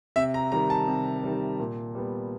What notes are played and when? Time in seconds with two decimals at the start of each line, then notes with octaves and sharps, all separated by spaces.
0.16 C3 E5
0.34 A#5
0.52 D#3 G3 A#5
0.70 A5
0.88 C3
1.24 D#3 G3
1.59 A#2
1.95 G3 B3